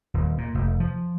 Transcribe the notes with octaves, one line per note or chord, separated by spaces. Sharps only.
D#1
A#2
F1
F3